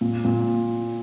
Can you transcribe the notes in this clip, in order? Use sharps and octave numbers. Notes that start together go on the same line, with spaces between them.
A#2
A#2